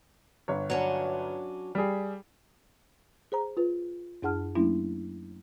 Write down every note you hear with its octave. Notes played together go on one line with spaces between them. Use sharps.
G1 C#5
F#3 C#4 D4
G3 G#4
G#4 C5 A#5
F4 B4
F#2 D4 G#4 F#5 A5 F6
F#3 A3 A#3 C#4 D4 E4